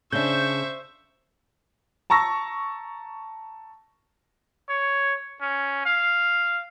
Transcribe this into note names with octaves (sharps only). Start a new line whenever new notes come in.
C#3 D4 C5 E5 C#6 G6
A5 A#5 C#6 E6 A#6
C#5
C#4
F5